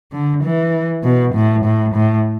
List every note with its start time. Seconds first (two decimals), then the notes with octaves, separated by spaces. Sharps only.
0.13 D3
0.43 E3
1.04 B2
1.34 A2
1.65 A2
1.95 A2